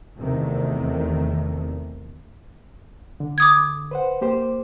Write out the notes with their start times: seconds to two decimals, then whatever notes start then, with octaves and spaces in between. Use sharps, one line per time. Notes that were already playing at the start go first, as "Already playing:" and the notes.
0.19 E2 C3 D#3 A3
3.20 D3
3.38 D6 D#6 G#6
3.91 B4 C5 F#5
4.21 A#3 G4 C5